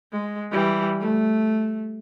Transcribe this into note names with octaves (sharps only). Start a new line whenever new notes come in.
G#3
E3 G3
A3